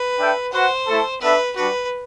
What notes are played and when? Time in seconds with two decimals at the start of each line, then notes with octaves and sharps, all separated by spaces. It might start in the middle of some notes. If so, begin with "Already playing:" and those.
Already playing: B4
0.18 D4 A4 E5 G5
0.52 F#4 B4 C5 F#5
0.87 A3 E4 A4
1.21 B3 D4 A4 B4 E5
1.55 G3 D4 F#4 B4